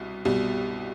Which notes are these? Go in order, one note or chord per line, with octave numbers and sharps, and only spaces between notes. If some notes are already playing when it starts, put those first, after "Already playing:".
Already playing: C2 B2
C2 B2 G3